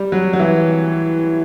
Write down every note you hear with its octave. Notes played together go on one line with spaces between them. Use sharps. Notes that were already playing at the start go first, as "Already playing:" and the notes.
Already playing: G3
F#3
F#3
E3